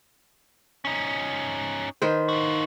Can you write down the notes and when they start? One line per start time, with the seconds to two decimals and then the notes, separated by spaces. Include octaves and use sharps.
0.85 C#4 D#4
2.02 D#3 B4 C5
2.29 A#3 F#4